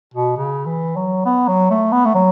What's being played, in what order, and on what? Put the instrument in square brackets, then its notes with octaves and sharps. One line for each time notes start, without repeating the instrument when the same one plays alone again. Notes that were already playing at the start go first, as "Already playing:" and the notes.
[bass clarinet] B2
C#3
E3
F#3
B3
F#3
A3
B3
A3
F#3